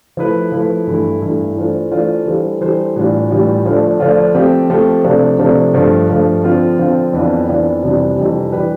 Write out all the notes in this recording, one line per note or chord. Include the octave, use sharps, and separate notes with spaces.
F3 A3 E4 B4
F3 A3 E4 B4
G2 E3 A3 E4
G2 E3 A3 E4
E3 A3 D4 F4 C5
E3 A3 D4 F4 C5
E3 G3 D4 A4 C5
E3 G3 D4 A4 C5
A2 E3 G3 D4 F4
A2 E3 G3 D4 F4
D3 F3 A3 D4 F4
D3 F3 A3 D4 F4
F3 A3 C4 G4
F3 A3 C4 G4
C3 F3 A3 D4
C3 F3 A3 D4
G2 F3 A3
G2 F3 A3
D3 F3 C4 F4
D3 F3 C4 F4
F2 E3 B3 D4 F4
F2 E3 B3 D4 F4
F2 C3 E3 G3 D4
F2 C3 E3 G3 D4
E3 G3 D4 G4 B4